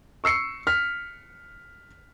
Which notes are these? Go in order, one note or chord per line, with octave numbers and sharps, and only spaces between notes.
C#6 E6 C7 C#7
F6 B6